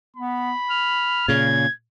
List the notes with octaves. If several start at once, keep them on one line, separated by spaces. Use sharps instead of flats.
B3 B5
F6
A#2 C#3 G#6